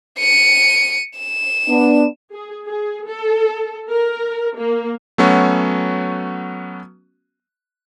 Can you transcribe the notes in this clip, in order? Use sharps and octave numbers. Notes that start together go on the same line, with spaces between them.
C#7 D#7
E7
B3 D4
G#4
G#4
A4
A#4
A#3
F#3 A3 B3 C#4 F#4